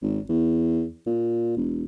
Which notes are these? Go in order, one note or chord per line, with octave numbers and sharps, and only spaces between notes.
G#1
E2
A#2
E1